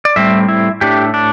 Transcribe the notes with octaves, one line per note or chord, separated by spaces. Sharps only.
D5
A2 G3 C4 E5
E4
A2 A3 D4 G4
D4